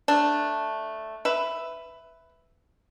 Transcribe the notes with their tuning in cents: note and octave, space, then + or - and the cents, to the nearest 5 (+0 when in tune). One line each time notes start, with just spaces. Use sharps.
A3 +0 D4 +0
B4 +10 E5 +0 B5 +0